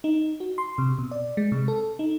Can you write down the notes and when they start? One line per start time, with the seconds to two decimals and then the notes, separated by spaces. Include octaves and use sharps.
0.04 D#4
0.40 F#4
0.58 C6
0.78 C3
0.99 B2
1.11 D5
1.37 G#3
1.52 C3
1.68 A4
1.99 D#4